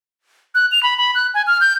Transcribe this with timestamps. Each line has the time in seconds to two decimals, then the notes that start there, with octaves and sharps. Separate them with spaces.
0.55 F#6
0.72 F7
0.83 B5
0.97 B5
1.15 F#6
1.34 G#5
1.47 F6
1.61 G6